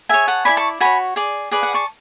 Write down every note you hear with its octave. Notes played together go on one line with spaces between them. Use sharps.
G#4 C#5 E5 G#5
F#5 A5
E4 A4 D5 G#5 B5
A5 C#6
F#4 C#5 G#5 B5
G#4 D5
G#4 B4 D5
F#5
A5 C#6